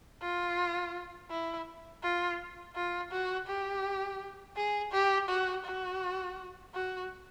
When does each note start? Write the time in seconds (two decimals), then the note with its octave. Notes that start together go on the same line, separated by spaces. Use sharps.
0.22 F4
1.31 E4
2.03 F4
2.75 F4
3.12 F#4
3.48 G4
4.56 G#4
4.92 G4
5.29 F#4
5.65 F#4
6.74 F#4